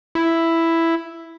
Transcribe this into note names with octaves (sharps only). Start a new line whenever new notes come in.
E4